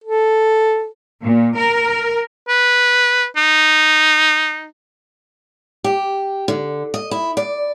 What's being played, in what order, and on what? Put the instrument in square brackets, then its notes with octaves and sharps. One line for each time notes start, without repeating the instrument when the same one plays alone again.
[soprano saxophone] A4
[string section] A#2
A#4
[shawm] B4
D#4
[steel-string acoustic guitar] G4
D3
D#5
E4
D5